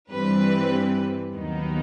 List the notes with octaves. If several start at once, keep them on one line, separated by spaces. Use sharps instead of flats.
G2 E3 G3 C4 B4
D#2 D#3 F#3 B3 D#4